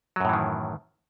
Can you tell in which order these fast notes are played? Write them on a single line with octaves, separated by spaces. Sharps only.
F#3 F#2 A2 E3 D#3